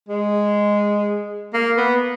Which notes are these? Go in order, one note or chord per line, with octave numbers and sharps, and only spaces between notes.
G#3
A#3
B3